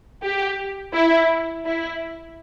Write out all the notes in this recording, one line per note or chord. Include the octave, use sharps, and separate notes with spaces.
G4
E4
E4